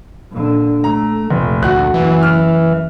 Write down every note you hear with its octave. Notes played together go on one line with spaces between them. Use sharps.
A#2 D3
A3 A#5
F1 A#1 A3
D2 F#4 F#6
F#1 E3
F6